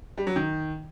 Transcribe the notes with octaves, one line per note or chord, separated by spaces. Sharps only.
G3
F#3
D#3